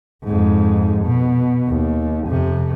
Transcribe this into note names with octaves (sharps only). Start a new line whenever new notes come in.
F2 G#2
B2
D#2
F2 C3